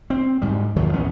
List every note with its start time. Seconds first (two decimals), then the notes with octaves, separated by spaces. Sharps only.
0.10 C4
0.42 D2 G#2 G3
0.76 D#2 D#3 F3 F#3
0.93 A#1 E2 B3 C#4